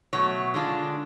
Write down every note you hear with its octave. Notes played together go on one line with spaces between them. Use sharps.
B2 F#3 A3 C#5
D3 G#3 D4 F4